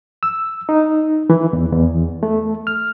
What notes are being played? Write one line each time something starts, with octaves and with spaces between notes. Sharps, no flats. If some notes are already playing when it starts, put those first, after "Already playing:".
E6
D#4
E3
E2
E2
A3
F6